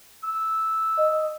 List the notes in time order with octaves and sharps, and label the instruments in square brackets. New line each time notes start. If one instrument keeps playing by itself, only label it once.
[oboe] E6
[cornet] D#5